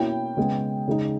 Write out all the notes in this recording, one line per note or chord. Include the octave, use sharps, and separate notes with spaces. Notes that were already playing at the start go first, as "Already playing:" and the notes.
Already playing: B2 A#3 C#4 E4 G5
C#3 G#3 B3
C#3 G#3 D#4